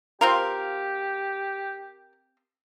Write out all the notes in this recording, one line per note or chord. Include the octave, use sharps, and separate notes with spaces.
C4 F4 G4 A#4 F5